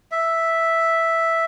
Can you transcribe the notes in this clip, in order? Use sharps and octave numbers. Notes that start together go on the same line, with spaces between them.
E5